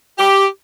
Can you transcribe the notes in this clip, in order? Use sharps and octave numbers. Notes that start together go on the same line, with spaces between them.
G4